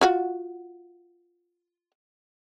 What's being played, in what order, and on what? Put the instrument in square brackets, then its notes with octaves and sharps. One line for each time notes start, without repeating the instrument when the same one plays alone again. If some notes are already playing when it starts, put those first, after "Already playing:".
[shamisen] F4 F#4 F#5